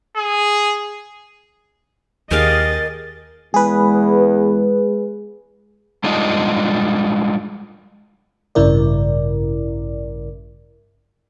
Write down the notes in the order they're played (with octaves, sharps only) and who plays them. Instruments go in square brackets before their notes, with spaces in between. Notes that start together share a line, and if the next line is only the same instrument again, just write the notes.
[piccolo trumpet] G#4
[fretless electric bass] D#2 [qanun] G4 G#4 F5 [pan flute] A#4 [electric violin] D#5 A6
[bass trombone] E2 [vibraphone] G#3 [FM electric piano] G#4 B4
[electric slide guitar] G3 G#3 D4 D#4 F4 D#5
[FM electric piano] A1 G2 C#3 E4 A#4 D5